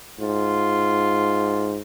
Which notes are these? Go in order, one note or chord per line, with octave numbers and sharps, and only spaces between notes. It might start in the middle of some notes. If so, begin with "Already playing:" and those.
G#2 F4